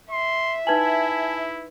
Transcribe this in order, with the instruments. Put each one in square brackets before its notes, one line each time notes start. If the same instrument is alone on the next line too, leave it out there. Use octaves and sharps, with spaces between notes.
[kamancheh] E5 [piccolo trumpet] C6
[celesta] D#4 B4 F#7 [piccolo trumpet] E4 [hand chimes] G#5 A5 G#6